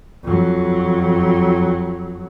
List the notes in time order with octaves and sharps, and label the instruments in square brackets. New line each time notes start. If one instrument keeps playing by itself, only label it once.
[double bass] F2 F#3